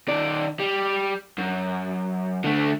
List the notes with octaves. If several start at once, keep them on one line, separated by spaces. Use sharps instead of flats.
D#3 D5
G3
F#2
D3 A3